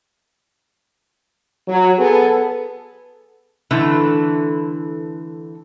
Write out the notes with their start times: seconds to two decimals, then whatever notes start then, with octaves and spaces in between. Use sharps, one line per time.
1.68 F#3
1.99 B3 G#4 A4
3.71 D3 E3 A3